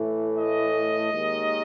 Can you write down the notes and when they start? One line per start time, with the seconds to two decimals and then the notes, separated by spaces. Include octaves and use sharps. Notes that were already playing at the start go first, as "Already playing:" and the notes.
Already playing: A2 E3 A3
0.35 D#5
1.14 D#2 D#3 G#3